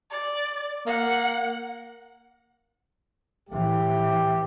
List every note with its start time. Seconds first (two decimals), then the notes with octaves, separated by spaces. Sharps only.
0.10 D5
0.87 A#3 F#5
3.49 A2 E3 G4